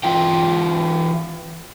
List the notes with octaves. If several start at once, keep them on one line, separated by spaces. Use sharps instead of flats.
E3 F4 G5